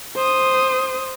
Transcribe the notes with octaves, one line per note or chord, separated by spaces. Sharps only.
C5 D#6